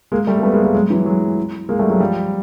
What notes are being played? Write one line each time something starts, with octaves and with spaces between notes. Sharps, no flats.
G#3 A#3
G3 A3
A#3
A3 B3
G#3 A#3
G#3 A#3
F#3 G#3
E3 F#3
F#3 G#3
G#3 A#3
G3 A3
F#3 G#3
F3 G3